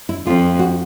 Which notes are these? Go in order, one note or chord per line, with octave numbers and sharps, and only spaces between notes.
E4
F2 F4
F#4